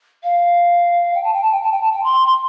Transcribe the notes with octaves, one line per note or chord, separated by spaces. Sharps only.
F5
G5
A5
G5
A5
G5
A5
G5
A5
G5
C6
C6